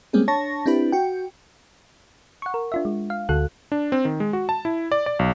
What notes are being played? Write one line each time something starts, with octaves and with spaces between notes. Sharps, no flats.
G3 G#3 A#3 C4 C#4 G#4
D4 C#5 A5 C#6 A#6
C4 D4 E4 G4 B4
F#4 G5
F#5 C#6
A#4
D4 F4 E5
G#3
F5
D2 D3 F#4 A4 F#6
D4
C4
D#3
G#3
F#4
A5
E4
D5
D5
B1